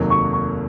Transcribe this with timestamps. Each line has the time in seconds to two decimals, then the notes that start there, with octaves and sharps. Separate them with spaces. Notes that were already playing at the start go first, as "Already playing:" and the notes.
Already playing: F1 D#2 D#3 F#3 A#3
0.10 C#6
0.33 C#6